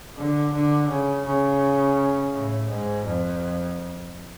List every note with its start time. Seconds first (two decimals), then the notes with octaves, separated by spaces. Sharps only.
0.17 D3
0.53 D3
0.89 C#3
1.25 C#3
2.32 A2
2.69 G#2
3.05 F2